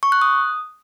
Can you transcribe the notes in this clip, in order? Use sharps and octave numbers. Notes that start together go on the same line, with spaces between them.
C#6
F#6
D#6